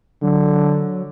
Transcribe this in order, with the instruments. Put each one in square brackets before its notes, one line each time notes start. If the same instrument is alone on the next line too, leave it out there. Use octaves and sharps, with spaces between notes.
[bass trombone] D3 [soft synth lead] F#3